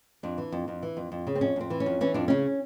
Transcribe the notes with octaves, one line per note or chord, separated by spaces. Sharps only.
F2 D4
E3
F2
F2
E3
F2
F2
C#3
C4
F2 C#4
F2 C4
E3
C#4
F2
E3 C#4
F2 D4
C#3 C#4